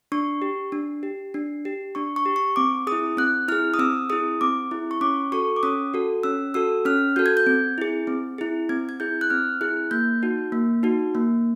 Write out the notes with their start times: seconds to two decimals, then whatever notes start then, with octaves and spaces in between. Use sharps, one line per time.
0.12 D4 C#6
0.42 G4
0.72 D4
1.03 G4
1.34 D4
1.65 G4
1.95 D4 C#6
2.16 C#6
2.26 G4
2.36 C#6
2.56 C4 D6
2.87 G#4 D#6
2.92 E4
3.17 C4 F#6
3.48 E4 G#4 F6
3.74 D#6
3.79 C4 E6
4.10 E4 G#4 D#6
4.41 C4 D6
4.71 E4 G#4
4.91 C#6
5.01 C#4 D6
5.32 F#4 A4 C#6
5.56 D6
5.63 C#4 D#6
5.94 F#4 A4
6.23 C#4 E6
6.54 F#4 A4 E6
6.85 C#4 F6
7.16 F#4 A4 G6
7.26 G#6
7.37 G6
7.46 C4
7.78 E4 G#4
8.07 C4
8.38 E4 G#4
8.69 C4 G#6
8.89 G#6
9.00 E4 G#4 G6
9.21 F#6
9.30 C4 F6
9.61 E4 G#4 F#6
9.91 A#3 G6
10.23 D#4 F#4
10.52 A#3
10.83 D#4 F#4
11.15 A#3